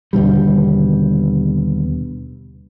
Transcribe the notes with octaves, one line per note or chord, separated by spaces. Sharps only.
D#2 B2 D3 G3